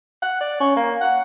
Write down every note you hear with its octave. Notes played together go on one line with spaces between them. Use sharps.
F#5
D5
C#4
A#3
F#5